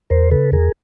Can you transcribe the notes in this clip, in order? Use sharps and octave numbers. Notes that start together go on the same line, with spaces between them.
E2 A#4 C5
C#3 A4 B4
E2 G#4 A#4